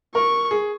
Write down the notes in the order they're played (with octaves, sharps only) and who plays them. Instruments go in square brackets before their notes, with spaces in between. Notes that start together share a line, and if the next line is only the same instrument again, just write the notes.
[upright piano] A#4 [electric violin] C#6
[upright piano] G#4